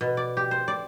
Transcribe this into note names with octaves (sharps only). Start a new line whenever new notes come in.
B2
D5
G4
C5
D5